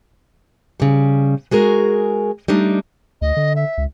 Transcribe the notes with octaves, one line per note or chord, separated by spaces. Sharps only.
C#3 G3
G#3 F#4 G#4 A#4
G3 A3 D4 D#4
D2 D#5
D3
E5
C#2